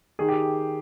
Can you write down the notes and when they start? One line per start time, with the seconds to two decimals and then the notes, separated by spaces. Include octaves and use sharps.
0.19 D#3 G#4
0.29 G4